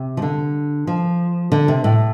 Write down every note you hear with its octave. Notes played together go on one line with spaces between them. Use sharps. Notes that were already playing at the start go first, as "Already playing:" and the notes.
Already playing: C3
F3
D3
F3
D3
C3
A2